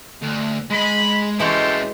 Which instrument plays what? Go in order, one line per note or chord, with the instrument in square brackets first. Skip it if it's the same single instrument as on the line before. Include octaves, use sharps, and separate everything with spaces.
[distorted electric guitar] D2
[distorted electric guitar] G#3 D#5 [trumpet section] B5
[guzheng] E3 G#3 F#4 [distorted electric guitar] C#4 E4 [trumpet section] G4 A4 C5